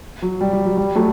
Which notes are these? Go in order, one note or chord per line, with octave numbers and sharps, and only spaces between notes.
F#3
G3
G3
F#3
G3
F#3 A3